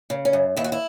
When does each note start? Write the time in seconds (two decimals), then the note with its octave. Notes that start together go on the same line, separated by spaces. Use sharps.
0.10 C#3
0.25 C#4
0.33 F#2
0.57 D#2 E4
0.64 F#4
0.72 E4